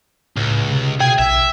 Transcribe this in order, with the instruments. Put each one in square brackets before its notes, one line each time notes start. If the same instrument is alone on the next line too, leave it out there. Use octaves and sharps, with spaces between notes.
[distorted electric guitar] C#2 [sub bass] A2
[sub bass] C3
[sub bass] B2 [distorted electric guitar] G#4 G#5 [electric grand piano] G5
[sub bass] B1 [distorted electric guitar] E5